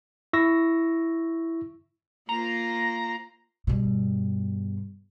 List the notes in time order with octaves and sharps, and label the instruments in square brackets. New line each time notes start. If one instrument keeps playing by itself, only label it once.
[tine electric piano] E4 C#6 E6 A#6
[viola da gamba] A#3 F4 C5 [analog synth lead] A#5
[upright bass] G2 B2